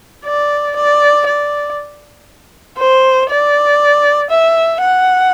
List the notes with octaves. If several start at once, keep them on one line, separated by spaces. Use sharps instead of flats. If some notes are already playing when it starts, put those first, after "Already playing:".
D5
D5
D5
C5
D5
E5
F#5